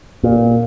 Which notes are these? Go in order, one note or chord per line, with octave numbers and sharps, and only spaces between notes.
A#2